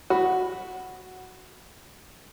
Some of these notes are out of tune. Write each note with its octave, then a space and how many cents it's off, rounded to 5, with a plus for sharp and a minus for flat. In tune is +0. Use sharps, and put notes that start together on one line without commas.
F#4 +0 B5 +0